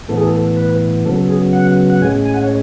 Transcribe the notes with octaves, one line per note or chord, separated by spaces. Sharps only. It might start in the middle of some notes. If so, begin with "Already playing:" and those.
A2 E3 B3 A4
G#4
A4
B4
C#3 F#3 B3 A4
G#4
F#5
F#5
A2 G#3 C#4 G#5
G#5
F#5
C#5